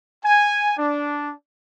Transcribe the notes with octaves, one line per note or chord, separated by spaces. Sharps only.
G#5
D4